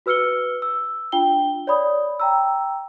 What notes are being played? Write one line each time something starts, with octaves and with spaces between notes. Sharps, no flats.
F#4 B4 E6 F6 C#7 G7
E6
D4 F4 G5 G7
C#5 D5 B5 D#6
G5 A#5 E6